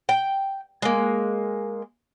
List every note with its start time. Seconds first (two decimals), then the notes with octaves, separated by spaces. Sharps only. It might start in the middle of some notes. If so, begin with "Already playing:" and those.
0.09 G5
0.82 G#3 A#3